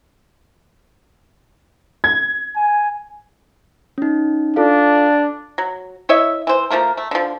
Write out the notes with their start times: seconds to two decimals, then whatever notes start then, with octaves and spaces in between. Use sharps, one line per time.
2.04 G#6
2.56 G#5
3.98 C#4 D#4
4.56 D4 F4 A4 F5
5.58 F#3
6.09 E4 C#5 D#5 E5
6.47 E3 C5
6.70 F3 A3 A#3 A#4
6.97 A3
7.11 D3 F3